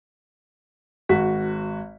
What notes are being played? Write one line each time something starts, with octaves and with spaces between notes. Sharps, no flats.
G#1 F#4 B6